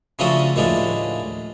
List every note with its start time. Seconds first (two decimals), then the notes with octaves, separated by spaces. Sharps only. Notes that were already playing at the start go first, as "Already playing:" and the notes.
0.19 C#3 F3 A3 D4 F#4 D#6
0.56 D#2 A2 F3 G#3 D4